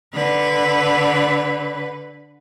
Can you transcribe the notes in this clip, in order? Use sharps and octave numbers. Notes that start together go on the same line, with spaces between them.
D3 B4